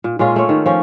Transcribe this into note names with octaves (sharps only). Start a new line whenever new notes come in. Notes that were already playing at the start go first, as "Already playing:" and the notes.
A#2
A#2 G#3 C#4 F4
A3 C#5
D#3
F3 C#4